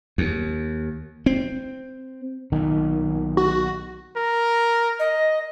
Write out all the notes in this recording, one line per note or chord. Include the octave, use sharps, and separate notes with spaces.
D#2
C4
B1 A#2 D#3
F#4
A#4
D#5